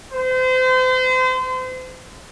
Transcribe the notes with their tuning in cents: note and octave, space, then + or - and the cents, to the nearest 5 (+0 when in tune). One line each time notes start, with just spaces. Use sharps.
C5 -35